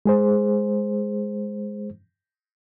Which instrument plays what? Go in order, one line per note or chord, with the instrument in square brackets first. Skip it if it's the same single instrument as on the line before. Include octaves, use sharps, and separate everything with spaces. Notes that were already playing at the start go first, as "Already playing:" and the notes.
[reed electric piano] G#3 G#4 C5